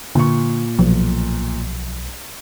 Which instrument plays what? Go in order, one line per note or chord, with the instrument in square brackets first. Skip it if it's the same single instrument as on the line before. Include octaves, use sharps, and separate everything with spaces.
[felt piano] A#2 C#6 [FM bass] D3
[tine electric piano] B1 [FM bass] F3